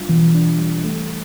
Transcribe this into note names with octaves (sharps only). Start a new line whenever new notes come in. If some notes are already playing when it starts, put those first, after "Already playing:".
Already playing: G3 D4 F4
B2 E3
D4
G3
A3